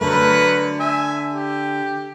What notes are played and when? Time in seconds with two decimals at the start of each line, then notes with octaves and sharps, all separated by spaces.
0.01 D3 F#3 A3 A#4 B4
0.80 E5 G#5
1.33 G4